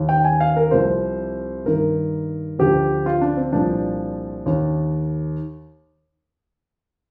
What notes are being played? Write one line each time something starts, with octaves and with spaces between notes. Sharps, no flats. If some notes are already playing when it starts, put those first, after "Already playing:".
Already playing: D#2 D#3
G5
G#5
F5
A#4
C2 C3 F3 C5
G2 D#3 A#4
D2 D3 F3 G4
F4
D4
C4
C2 A#2 F3 D4
D#2 D#3